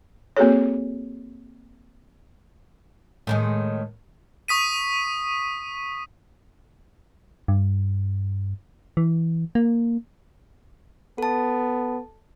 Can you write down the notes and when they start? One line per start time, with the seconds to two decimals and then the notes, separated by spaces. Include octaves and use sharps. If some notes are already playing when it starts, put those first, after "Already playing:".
0.37 A#3 C4 F#4 G#4 A4 C#5
3.27 A2 D#3 G#3
4.48 C#6 D#6 B6 D#7
7.48 G2
8.97 E3
9.55 A#3
11.18 B3 A4 A5